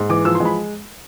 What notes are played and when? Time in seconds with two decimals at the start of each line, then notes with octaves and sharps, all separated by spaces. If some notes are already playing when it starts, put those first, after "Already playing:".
Already playing: G#2
0.09 E3 D6
0.25 F3 E6
0.35 C6
0.40 G#3
0.45 B5